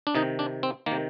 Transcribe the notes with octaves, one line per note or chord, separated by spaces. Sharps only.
D4
C3 D#3 D#4
D4
C4
D#3 A#3
C3